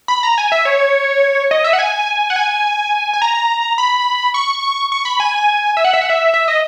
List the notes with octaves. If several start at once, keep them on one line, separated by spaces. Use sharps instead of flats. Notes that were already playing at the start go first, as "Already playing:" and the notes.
B5
A#5
G#5
E5
C#5
D#5
E5
F#5
G#5
F#5
G#5
G#5
A#5
B5
C#6
C#6
B5
G#5
E5
F#5
E5
F#5
E5
E5
D#5